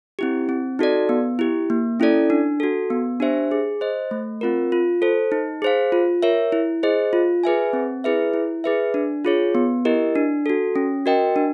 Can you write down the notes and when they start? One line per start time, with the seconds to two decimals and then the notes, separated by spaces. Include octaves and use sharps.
0.19 C4 E4 G4
0.49 C4
0.79 D#4 F#4 A4 D5
1.09 B3
1.39 E4 G4
1.70 A#3
2.00 C#4 E4 A4 D5
2.30 D4
2.60 F#4 A4
2.90 B3
3.20 D4 G4 C5 E5
3.51 G#4
3.81 C5 D#5
4.11 A3
4.41 C4 F4 A#4
4.72 F4
5.02 A4 C5
5.32 D#4
5.62 G#4 C5 F5
5.92 F4
6.23 A#4 C#5 E5
6.52 E4
6.83 G#4 C5 D#5
7.13 F4
7.44 G#4 B4 E5 G#5
7.73 C4
8.04 E4 G#4 B4 E5
8.34 E4
8.64 G#4 B4 E5
8.94 D4
9.25 F4 G#4 C#5
9.55 B3
9.85 E4 G4 A#4 D#5
10.15 D4
10.46 F#4 A4
10.76 C#4
11.06 F#4 A#4 D#5 G5
11.36 D4